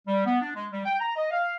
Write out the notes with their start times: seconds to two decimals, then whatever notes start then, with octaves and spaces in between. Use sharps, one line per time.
0.08 G3
0.26 B3
0.42 D4
0.55 G#3
0.72 G3
0.86 G5
1.00 A#5
1.16 D#5
1.31 F5